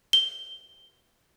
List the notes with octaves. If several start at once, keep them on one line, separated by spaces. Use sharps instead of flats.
G7